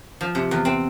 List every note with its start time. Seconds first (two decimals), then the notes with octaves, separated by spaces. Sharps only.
0.21 F3
0.35 C3
0.51 E2
0.65 C4